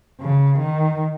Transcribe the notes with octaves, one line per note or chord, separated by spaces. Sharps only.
C#3
D#3